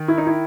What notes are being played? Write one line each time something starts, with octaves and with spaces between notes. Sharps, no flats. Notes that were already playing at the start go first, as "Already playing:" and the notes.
Already playing: D#3
E4
D#4
E4